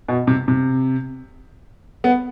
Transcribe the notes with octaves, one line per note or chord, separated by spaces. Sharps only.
B2
C3
C3
B3